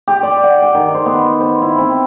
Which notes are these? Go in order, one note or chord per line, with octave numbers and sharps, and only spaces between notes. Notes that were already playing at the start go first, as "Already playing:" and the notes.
G4
D5
F#5
G5
D#3
C5
B3
C5
E4
C4